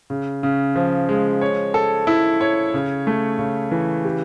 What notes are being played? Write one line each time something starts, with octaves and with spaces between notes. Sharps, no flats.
C#3
C#3
F3
G#3
C#5
A4
E4
C#5
C#3
A3
C#3
E3
G4